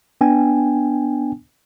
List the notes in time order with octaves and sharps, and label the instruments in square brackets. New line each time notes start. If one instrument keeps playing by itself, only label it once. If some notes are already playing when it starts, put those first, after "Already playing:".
[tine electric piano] B3 D4 G5 G#5